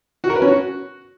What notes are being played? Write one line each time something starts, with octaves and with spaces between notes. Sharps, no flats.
F#4
A#4
B4
C#4
F#4